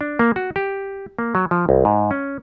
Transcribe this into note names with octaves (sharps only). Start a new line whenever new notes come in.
D4
A#3
F#4
G4
A#3
F#3
F3
C2
G#2
C#4